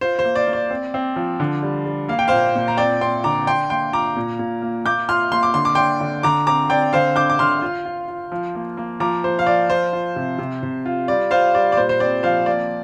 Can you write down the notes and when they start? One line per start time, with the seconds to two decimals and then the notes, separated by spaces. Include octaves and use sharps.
0.01 F4 C5
0.19 C5
0.24 A#3
0.35 D5
0.47 A#3
0.53 D5
0.70 C4
0.94 C4
1.16 F3
1.40 D3
1.63 G3
1.86 G3
2.08 A#3 F5
2.19 G5
2.28 A#2 C5 F5
2.56 A#2
2.68 A#5
2.77 C4 D5 G5
3.01 C4 G5 C6
3.24 D3 A#5 D6
3.47 D4 G5 C6
3.70 A#3 G5 C6
3.93 F4 A#5 D6
4.16 A#2
4.39 A#2
4.62 A#3
4.85 A#3 D6 G6
5.08 F4 C6 F6
5.32 A#3 C6
5.43 D6
5.54 D3 C6
5.65 D6
5.75 D4 G5 C6
6.01 D3
6.23 D3 A#5 D6
6.47 C4 A#5 D6
6.70 C4 D5 G5
6.93 D3 C5 F5
7.16 D3 D6 G6
7.30 D6
7.39 D3 C6 F6
7.62 F4
7.86 F4
8.08 F4
8.32 F3
8.55 A#3
8.77 A#3
9.00 F3 A#5 D6
9.24 F3 C5
9.39 F5
9.46 F3 D5
9.70 F4 C5
9.93 F4
10.16 C3
10.38 C3
10.63 C3
10.86 F4
11.08 G3 D5
11.31 F4 C5 F5
11.54 G3 D5
11.72 D5
11.77 A#2 C5
11.89 C5
12.00 C4 D5
12.23 F3 C5 F5
12.46 A#3 D5